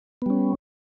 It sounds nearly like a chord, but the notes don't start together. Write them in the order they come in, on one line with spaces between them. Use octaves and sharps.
B3 G3 C#4